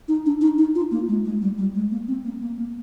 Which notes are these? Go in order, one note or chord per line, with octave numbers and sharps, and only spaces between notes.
D#4
D4
D#4
D#4
F4
A#3
G#3
G#3
G3
G3
G#3
A#3
C4
A#3
A#3
A#3